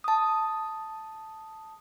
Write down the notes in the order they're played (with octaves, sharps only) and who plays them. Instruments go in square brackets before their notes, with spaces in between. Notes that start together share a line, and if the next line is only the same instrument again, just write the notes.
[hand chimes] A5 D#6